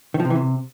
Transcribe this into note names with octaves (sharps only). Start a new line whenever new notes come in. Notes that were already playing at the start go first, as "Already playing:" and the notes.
D#3
F3
C3
E3
C3